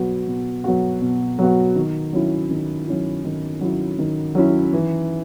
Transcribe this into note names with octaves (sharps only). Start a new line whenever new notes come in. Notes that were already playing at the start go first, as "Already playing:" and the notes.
Already playing: B2 F#3 B3 F#4
B2
F#3 B3 F#4
B2
F#3 B3 F#4
D#3
F#3 C#4 E4
D#3
F#3 C#4 E4
D#3
F#3 C#4 E4
D#3
F#3 C#4 E4
E3